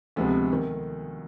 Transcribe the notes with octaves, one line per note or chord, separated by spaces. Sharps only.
D2 C3 F3 G#3 B3
D#3